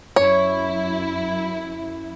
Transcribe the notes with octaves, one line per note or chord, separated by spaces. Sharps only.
F#2 E4 C#5